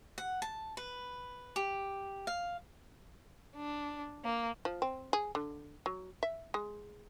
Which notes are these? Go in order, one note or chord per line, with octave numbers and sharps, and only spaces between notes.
F#5
A5
B4
G4
F5
D4
A#3
F3
C4
G#4
D3
F#3
E5
G#3